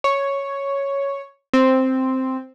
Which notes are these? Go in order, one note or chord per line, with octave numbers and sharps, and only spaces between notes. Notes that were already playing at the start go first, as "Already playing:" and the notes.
C#5
C4